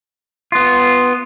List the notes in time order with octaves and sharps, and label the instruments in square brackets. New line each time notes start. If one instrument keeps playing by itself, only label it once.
[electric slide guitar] B3 F4